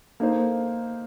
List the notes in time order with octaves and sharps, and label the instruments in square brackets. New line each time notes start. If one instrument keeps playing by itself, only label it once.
[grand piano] A#3 D#4 A4 C5